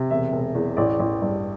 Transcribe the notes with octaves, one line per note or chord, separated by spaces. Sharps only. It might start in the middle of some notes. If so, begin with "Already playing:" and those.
Already playing: C3
E1 E5
E1
E2
A1 D5
A1
G2